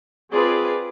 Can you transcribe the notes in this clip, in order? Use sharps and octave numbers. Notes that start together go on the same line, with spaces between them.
C4 F4 G#4 B4 D5